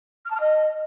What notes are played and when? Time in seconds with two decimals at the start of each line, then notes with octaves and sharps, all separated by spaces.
0.25 F6
0.30 A5
0.35 F6
0.40 D#5